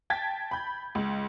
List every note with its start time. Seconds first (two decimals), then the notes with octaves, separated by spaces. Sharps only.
0.10 G5 A5 G#6 A6 B6
0.51 B5 G6
0.95 C#2